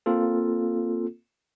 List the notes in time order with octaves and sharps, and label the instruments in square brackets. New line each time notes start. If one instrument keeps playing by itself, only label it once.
[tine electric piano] A#3 C4 F4 A4